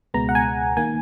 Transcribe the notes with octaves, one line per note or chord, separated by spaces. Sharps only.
C#2 B2 G#3 B3 A#5
F#5
G#5
D#3 A#3 G#5